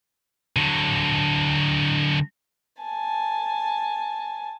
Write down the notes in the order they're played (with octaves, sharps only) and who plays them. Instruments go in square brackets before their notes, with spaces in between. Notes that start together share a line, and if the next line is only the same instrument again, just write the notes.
[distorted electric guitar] D3 F#3
[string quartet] G#5 A5